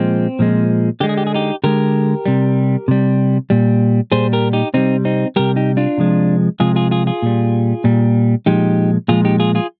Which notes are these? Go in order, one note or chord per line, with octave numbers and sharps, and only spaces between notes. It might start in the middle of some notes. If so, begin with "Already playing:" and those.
Already playing: A#2 F3 G#3 C4
A#2 F3 G#3
D3 G#3 G4
G#4
G4
G#4
D#4 G4
D3 G#3 G4 A#4
C3 G3
C3 G3
A#2 G3
A#2 G3 G#4 C5
G4 A#4
D#4 G4
C3 G3 C4 D#4
C4 D#4
C3 G3 G4 A#4
D#4 G4
D4 F4
C3 F3 G#3
C3 F3 G#3 F4 G#4
F4 G#4
F4 G#4
F4 G#4
A#2 G3
A#2 G3
A#2 F3 G#3 D#4 G4
A#2 F3 G#3 F4 G#4
D#4 G4
F4 G#4
F4 G#4